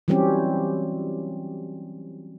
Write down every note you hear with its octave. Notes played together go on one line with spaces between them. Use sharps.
E3 F#3 G3 C4 C#4 G4